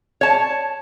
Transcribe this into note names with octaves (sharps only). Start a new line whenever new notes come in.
C#5 A5